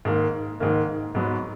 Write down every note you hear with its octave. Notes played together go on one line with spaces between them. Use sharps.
G#2 D#3 A#3
G#2 D#3 A#3
G#2 F#3 B3